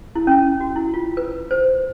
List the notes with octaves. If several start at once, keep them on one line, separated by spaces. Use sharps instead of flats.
E4
C#4
F#4
E4
F4
B4
C5